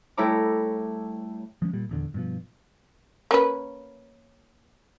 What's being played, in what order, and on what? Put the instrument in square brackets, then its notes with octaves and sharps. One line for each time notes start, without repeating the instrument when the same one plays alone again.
[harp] G3 A3 E4 C#5 A#5 D6
[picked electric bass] F3 G#3 C#4
A#2 G3
D#1 E2 D3
G2 B2 F3
[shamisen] A#3 C#4 B4